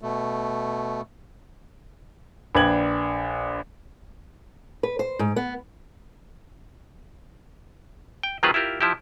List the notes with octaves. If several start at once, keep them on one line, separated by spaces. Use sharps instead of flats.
B2 A3
A#1 B4 D5 G5 G#6 F#7
B4
C5
G#2
B3
G5
D#3 F#3 C4 F4 G#4 B4
E4 F4 G4 A#4
F3 E4 G4